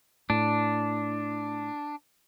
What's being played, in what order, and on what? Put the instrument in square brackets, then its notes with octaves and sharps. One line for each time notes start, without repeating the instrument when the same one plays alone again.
[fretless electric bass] A2 [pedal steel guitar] D4